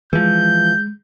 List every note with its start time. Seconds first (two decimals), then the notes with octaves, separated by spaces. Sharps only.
0.13 E3 F3 G#3 G6